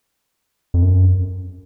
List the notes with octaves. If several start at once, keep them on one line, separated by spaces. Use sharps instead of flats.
F2
F#2